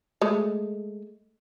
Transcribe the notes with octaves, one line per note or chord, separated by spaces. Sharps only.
G#3 A3